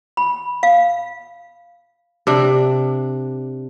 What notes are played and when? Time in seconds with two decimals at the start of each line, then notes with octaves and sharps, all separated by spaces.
0.17 B5
0.63 F5
2.27 C3 D4